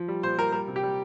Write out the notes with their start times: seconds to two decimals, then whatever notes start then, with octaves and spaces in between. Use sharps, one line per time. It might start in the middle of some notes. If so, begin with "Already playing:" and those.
Already playing: F3
0.08 G3
0.23 A#2 C5
0.38 G3 A#4
0.52 G3 A#4
0.68 C3
0.76 G4
0.83 G3